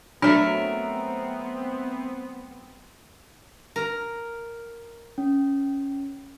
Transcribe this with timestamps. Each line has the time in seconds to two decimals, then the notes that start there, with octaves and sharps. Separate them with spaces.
0.22 F#3 A3 B3 C4 D4 A#4 E5
3.76 A#4
5.18 C#4